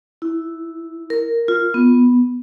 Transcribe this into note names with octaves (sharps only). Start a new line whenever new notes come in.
E4
A#4
F4
B3